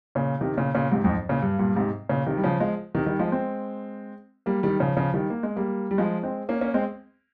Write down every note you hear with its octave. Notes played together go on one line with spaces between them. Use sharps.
A#2 C#3
C3 D#3
A#2 C#3
A#2 C#3
G#2 C3
F2 G#2
A#2 C#3
G2
G2 A#2
G#2 C3
A#2 C#3
C3 D#3
G3
C#3 F3
F3 G#3
C3 D#3
D#3 G3
F3 G#3
G#3 C4
G3 A#3
D#3 G3
C#3 F3
C#3 F3
D#3 G3
A#3
G#3
G3 A#3
G3
F3 G#3
G#3 C4
A#3 C#4
A#3 C#4
G#3 C4